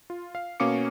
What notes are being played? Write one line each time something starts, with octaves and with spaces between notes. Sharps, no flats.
F4
F5
B2 A#3 C#4 F5 D6 C#7